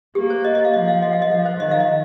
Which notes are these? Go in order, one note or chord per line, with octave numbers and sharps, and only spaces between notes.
A#3 G4
C5
D#5
D#5
F5
F3 D#5
F5
D#5
F5
D#5
F3 F5
C5
D#3 D#5
F5
D#5